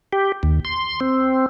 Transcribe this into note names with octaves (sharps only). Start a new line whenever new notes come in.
G4
D#2
C6
C4